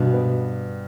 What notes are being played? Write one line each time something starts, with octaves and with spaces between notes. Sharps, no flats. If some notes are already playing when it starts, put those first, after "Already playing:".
Already playing: G2 B2
B3